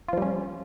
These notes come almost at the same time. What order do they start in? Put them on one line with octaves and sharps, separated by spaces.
F4 F3 G3 C#4